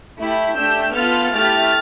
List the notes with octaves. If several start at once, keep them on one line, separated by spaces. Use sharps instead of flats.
A3 E4 G4
A3 D4 G4 E6 G6
B3 F4 A4 F6 A6
A3 E4 G4 F6 A6